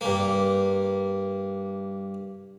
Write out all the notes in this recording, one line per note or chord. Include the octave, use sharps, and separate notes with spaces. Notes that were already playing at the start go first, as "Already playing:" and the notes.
G2 A#3